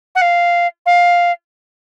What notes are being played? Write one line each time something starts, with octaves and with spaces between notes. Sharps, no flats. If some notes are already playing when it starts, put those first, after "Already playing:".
F#5
F5
F5